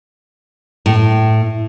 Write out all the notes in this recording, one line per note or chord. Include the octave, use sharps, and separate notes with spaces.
A2